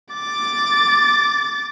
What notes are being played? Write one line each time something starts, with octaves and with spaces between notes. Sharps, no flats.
D6 A6